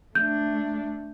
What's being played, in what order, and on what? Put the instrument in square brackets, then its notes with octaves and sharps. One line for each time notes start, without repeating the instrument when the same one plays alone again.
[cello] A3 D4 [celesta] G6